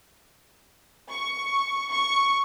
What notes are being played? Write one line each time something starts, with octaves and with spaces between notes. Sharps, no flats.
C#6
C#6